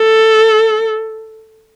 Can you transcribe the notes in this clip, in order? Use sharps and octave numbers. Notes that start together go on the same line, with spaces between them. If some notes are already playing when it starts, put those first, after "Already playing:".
Already playing: A4